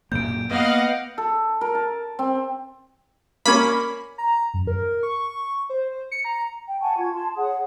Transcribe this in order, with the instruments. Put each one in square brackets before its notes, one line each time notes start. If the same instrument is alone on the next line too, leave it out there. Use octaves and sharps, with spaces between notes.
[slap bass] F#2 A#2 A#3 [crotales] G6 D7
[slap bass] A#3 [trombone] B3 [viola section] D#5 F5 F#5
[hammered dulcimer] A4
A#4
A5
C4
[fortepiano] A#3 C#4 [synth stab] B5
[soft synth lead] A#5
F#2
A#4
C#6
C5
C#7
A#5
[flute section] G5
F#5 G#5 A5 C#6
F4 G#6
A5 C6
G#4 C#5 F#5 D#6